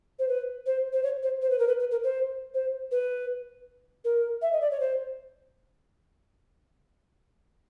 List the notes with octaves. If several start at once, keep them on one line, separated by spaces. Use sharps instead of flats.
C5
B4
C5
C5
C#5
C5
C5
B4
A#4
B4
B4
A#4
C5
C5
B4
A#4
E5
D#5
D5
C#5
C5